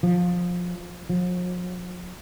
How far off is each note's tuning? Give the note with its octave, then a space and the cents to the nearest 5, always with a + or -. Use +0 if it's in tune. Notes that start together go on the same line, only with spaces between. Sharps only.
F3 +20
F3 +45